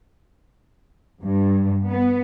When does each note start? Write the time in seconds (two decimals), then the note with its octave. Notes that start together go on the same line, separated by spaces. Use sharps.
1.24 G2
1.88 B3